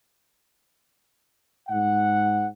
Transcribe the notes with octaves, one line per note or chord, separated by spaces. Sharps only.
G#2 F#5